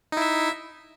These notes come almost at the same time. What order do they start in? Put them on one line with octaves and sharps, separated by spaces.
D#4 E4 E5